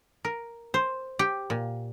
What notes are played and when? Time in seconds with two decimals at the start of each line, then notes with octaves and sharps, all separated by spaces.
0.25 A#4
0.74 C5
1.19 G4
1.50 A#2